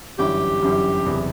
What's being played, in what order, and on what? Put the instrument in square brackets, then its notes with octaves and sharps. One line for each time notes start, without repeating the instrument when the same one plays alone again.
[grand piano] G1 F#2 E3 G3 [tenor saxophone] G4
[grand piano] G1 F#2 E3 G3
F#1 E2 C3